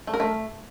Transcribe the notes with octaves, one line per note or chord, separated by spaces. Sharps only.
A3
A#4
A3